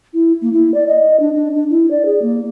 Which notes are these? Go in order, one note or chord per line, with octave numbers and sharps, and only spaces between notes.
E4
A#3
E4
D5
D#5
D4
D4
D4
E4
D5
G#4
A#3